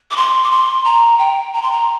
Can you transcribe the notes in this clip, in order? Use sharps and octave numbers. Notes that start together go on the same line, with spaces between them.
D6
C6
D6
C6
A#5
G5
A#5
C6
A#5